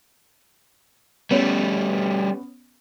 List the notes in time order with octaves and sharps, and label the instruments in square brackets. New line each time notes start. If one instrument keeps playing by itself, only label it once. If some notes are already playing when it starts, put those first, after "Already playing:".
[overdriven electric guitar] G3 A3 [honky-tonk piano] B3 C#4